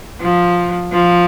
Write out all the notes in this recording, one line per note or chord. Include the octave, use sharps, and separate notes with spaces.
F3
F3